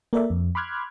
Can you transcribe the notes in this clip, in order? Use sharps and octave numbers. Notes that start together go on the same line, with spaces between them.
A#3 A4 A#4 D5 E5
F2
B5 C6 D6 F6 F#6 G#6